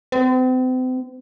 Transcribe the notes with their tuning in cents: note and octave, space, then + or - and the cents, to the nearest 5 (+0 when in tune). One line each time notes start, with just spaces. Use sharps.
C4 -40